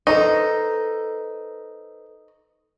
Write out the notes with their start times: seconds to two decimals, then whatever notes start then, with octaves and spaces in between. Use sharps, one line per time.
0.07 D#4 A4 B4 C5